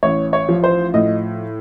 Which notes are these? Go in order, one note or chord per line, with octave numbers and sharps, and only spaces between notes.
A1 C#5
C#5
F3
C5
A2 D#5